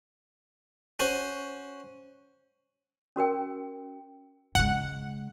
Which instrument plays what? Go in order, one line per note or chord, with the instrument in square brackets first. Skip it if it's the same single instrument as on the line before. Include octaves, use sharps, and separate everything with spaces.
[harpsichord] C#4 F#4 C5
[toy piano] C#4 F#4 A#4 G5
[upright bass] C#3 G#3 [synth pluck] F#5